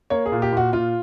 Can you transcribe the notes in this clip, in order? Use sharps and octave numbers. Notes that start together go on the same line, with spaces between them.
A#3 C#5
G#4
A#2
G4
A#2 F#4
A#2 F4